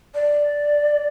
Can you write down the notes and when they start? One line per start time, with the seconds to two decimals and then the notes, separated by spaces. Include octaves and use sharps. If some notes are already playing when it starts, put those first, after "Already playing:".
0.14 D5